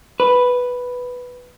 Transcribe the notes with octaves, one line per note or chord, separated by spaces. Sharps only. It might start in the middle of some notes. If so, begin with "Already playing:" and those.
B4